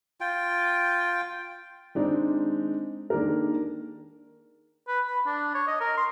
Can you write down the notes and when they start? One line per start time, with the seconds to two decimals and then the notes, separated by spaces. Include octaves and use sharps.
0.21 F4 G5
1.95 D#3 G#3 C4 D4 D#4
3.10 D#3 A#3 D4 G#4 A#4
4.88 B4
5.08 B5
5.26 D4
5.55 C#5
5.67 D#5
5.81 A#4
5.97 C6